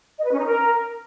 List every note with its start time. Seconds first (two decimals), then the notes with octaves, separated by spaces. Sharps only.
0.18 D#5
0.25 B4
0.32 C#4
0.38 D#4
0.45 A#4